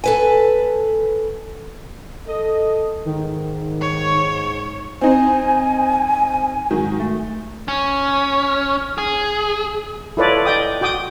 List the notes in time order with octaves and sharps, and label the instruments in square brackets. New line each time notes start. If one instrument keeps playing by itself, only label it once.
[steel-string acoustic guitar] A4 B4 G#5
[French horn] A4 [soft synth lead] D#5
[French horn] G#2 [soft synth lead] D#3
[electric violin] C#5
[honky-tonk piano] C4 D#4 C5 [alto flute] G#5
[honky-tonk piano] G#2 D#3 F#3
A3
[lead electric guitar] C#4
G#4
[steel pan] E4 F4 A4 B4 C#5 D5
D5 D#5 G5 D#6
F#4 G5 D6 D#6